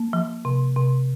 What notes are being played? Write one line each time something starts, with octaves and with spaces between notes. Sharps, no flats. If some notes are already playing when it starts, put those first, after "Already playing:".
Already playing: A#3
F3
C3
C3